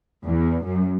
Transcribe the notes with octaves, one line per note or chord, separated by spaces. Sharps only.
E2
F#2